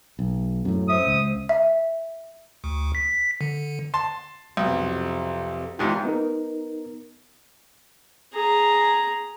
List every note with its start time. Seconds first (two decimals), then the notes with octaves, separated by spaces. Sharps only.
0.19 B1
0.65 F#2 A2
0.88 C5 E5 D#6
1.07 C#2
1.49 E5
2.64 D2
2.95 B6
3.41 D3
3.94 A5 C6
4.57 B1 F2 C3
5.79 E2 G#2 D#3 E4 F4 G4
6.05 B3 D#4 A#4
8.34 G#4 A#5